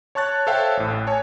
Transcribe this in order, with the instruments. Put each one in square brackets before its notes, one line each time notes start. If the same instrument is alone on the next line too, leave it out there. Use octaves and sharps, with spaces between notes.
[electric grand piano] C#5 A5 C#6 F#6 A6
A4 C5 C#5 E5 F5 G5
A1 A2
C#5 G#5 A5